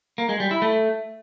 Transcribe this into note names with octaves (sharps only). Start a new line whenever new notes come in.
A#3
G#3
G3
E4
A3